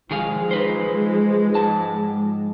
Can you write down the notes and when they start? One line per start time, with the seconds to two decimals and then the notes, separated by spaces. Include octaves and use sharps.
0.11 D#3 F3 G#3 G#4 F5
0.51 D#4 B4 C5
1.55 G#2 A5